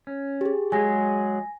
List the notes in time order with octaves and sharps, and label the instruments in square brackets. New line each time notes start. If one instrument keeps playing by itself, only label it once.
[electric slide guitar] C#4
[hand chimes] G4 G#4
[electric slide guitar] F#3 G#3 G#4 [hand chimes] G#5 A#6